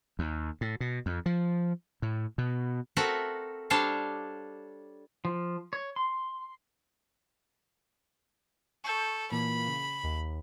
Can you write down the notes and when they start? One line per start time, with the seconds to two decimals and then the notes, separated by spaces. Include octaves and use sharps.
0.19 D#2
0.61 A2
0.80 B2
1.06 F2
1.26 F3
2.02 A2
2.38 B2
2.97 C4 F#4 A4 A#4 E5 F#5
3.70 G3 D4 A4 C5 C#5 F5
5.25 F3
5.73 C#5
5.96 C6
8.84 A4 C#6 G6
9.32 A#2 E3 A#3 B5
9.67 C#3
10.03 D#2